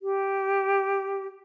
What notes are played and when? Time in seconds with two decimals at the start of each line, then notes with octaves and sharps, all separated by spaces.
0.02 G4